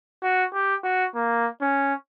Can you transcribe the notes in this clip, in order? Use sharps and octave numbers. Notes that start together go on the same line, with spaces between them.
F#4
G4
F#4
A#3
C#4